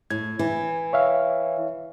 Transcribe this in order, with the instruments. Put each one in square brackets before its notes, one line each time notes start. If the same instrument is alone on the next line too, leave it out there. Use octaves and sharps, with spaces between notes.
[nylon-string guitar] A2 [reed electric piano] G#6
[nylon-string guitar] E3
[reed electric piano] C#5 E5 F5